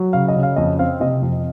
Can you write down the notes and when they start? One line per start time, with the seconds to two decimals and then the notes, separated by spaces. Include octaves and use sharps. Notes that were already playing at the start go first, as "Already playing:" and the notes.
Already playing: F#3
0.13 C#3 F5
0.28 D#5
0.36 C#3
0.43 F5
0.56 F2 D#5
0.79 C4 F5
1.00 C3 D#5
1.22 F2